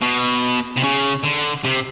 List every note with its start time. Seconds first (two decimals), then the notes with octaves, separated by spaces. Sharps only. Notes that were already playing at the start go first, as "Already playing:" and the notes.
0.02 B2
0.77 C3
0.84 C#3
1.24 D3
1.65 C3